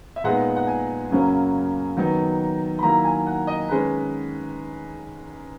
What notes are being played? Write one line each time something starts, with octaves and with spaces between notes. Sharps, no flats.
E5
A#2 G#3 B3 D#4 F#5
F#5
G#5
F#2 C#3 F#3 A#3 C#4
D#3 F#3 B3 D#4
B5
D#3 F#3 A#3 E4 A#5
G#5
F#5
D#5
D#3 G#3 C#4 B4